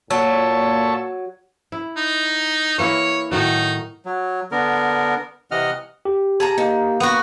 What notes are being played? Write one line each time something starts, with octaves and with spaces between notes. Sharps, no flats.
A#2 F#3 A#3 A5 C#6 E6
E4
D#4
E3 A#3 E4 C#5
A2 D#3 F#3 D#4
F#3
D3 B3 A#4
C3 E3 D#5 F#5 F6
G4
G#4 A5 A#5
A#3 D#4
B3 F#4